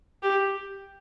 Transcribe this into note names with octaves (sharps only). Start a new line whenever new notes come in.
G4